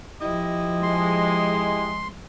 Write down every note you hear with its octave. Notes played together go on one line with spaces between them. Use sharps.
F3 E4 G4 D#5
G#3 C6